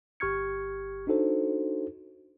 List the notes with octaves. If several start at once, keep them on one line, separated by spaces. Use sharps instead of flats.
G1 G4 C#6 F6 G#6 C#7
D4 D#4 F#4 A4 C5